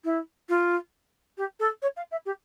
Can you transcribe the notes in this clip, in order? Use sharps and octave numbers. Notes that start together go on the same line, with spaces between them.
E4
F4
G4
A4
C#5
F5
E5
G4